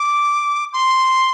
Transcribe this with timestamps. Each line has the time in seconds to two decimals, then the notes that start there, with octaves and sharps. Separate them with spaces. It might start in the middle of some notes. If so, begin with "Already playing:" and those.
Already playing: D6
0.73 C6